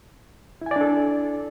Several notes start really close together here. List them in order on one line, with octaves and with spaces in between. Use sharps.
E4 G#5 D5 D4 A4